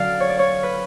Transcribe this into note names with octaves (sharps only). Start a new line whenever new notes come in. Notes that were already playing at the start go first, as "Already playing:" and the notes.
Already playing: D3 F#3 C#4 D5 F5
C#5
D5
C#5
B4